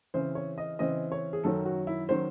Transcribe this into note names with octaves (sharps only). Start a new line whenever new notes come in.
C#3 E3 C4 C5
C#5
D#5
C#3 E3 C4 D#5
C#5
G#4
F#2 D#3 F#3 C#4 A4
F#4
E4
D#3 F#3 C#4 C5